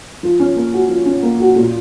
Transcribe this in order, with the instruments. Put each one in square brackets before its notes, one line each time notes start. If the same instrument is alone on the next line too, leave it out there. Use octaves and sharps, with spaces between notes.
[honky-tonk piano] F3
C#4
A#3
F#4
F3
C#4
A#3
F#4
A#2